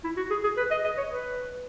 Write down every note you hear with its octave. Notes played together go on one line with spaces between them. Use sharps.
E4
F#4
G#4
G#4
B4
D#5
D#5
C#5
B4